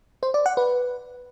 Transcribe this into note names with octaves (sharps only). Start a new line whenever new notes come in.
C5
D5
F#5
B4